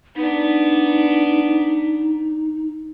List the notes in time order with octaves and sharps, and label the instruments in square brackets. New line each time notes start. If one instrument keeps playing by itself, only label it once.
[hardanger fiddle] B3 D4 [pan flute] D#4